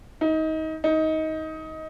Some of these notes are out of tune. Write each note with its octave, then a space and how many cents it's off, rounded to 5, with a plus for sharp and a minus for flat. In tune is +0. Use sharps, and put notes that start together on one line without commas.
D#4 +25
D#4 +20